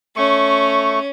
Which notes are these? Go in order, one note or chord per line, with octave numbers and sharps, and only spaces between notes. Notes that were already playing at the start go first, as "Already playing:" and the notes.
A3 C#4 C#6